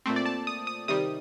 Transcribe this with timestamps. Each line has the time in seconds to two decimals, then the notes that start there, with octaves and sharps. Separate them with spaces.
0.06 A#2 A3 C4
0.16 D5
0.25 A5
0.47 D#6
0.67 D#6
0.88 C3 D#3 G3 D#6